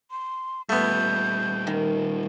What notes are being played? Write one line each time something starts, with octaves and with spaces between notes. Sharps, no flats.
C6
A#2 G3 A3 B3 G6
D#3